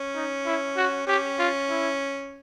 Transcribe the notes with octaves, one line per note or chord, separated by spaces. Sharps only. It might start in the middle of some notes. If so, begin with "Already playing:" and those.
Already playing: C#4
D#4
E4
F#4
C#4 G4
F4
E4